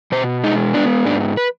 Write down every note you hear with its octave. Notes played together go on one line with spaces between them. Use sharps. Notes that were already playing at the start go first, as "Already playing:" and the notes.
B2 C5
G#3 D#4
B3 D4
G#2 D4
B4